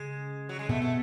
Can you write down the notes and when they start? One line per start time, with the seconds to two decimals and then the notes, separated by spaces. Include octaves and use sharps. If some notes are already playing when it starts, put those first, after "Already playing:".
Already playing: C#3 G#3 C#4
0.49 F#3
0.59 G#3
0.69 B2 A3 B3
0.82 A3